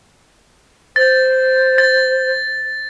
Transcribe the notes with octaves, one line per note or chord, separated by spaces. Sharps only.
C5 A6
A6